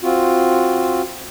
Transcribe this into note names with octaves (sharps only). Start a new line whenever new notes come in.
C4 F4 F#4